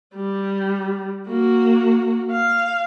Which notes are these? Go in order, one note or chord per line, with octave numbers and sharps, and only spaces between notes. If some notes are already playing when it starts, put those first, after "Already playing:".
G3
A#3 F#4
F5